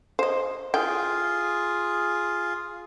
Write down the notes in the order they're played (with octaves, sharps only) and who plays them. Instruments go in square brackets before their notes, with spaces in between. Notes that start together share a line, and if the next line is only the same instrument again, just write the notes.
[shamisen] C5 D#5
[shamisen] E3 G5 [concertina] F4 G#4